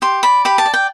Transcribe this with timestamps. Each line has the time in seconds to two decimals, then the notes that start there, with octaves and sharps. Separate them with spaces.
0.02 G4 C6
0.23 D5 B5
0.45 G4 B5
0.58 A5
0.66 D5
0.74 G5